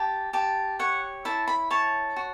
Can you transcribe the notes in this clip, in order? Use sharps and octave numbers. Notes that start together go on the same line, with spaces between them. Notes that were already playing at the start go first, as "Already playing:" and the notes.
Already playing: G4 A5
G4 A5
C#5 F#5
E4 A5
B5
C#5 A5
F#4